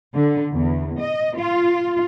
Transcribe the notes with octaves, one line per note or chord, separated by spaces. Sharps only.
D3
E2
D#5
F4